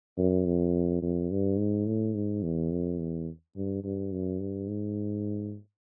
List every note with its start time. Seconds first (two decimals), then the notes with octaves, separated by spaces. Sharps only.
0.18 F#2
0.46 F2
1.02 F2
1.31 G2
1.58 G#2
1.87 A2
2.14 G#2
2.43 E2
2.71 F2
2.99 E2
3.56 G2
3.84 G2
4.12 F#2
4.40 G2
4.68 G#2